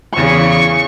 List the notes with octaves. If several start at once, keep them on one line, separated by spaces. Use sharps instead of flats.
E2 C#3 C#6